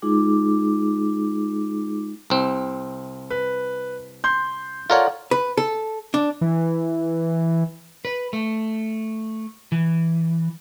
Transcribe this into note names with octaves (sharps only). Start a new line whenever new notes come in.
G#3 D#4 F4 G#4 D6
C2 C4
B4
C6 G6
F4 A4 A#4 C#5 D5 F#5
B4
A4
D4
E3
B4
A3
E3